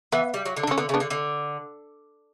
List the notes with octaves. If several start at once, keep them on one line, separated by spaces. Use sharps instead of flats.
E3 B3
G3
F#3
D3
D4
D3
C#4
D3 B3
C#3
B3 D4
D3
D3